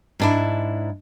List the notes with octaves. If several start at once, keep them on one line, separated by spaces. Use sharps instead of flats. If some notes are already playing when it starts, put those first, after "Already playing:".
G#2 D4 E4